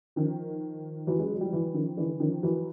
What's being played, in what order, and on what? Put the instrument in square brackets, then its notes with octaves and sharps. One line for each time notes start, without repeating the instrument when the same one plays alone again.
[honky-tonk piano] D#3 F3
E3 F#3
F#3 G#3
F#3
F3 G3
E3 F#3
D#3 F3
D3 E3
D#3 F3
E3 F#3